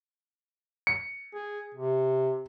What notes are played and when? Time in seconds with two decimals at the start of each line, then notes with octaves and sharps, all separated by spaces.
0.87 C#7
1.34 G#4
1.74 C3